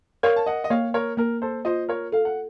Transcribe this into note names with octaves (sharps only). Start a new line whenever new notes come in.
A#4 C#5 F5
A5
D#5 F#5
D#5
A#3 C#5 F5
A#4 C#5
A#3 A#4
A4 C5
F4 C5 D#5
A#4 C#5
A4 F5
F#5